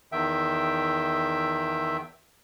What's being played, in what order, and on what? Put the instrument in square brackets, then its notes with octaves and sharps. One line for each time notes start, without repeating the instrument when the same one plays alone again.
[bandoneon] E2 D#3 E5 G5